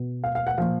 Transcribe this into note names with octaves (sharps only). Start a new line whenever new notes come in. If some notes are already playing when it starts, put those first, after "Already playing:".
Already playing: B2
F5
F5
F#5
A#2 F3 F5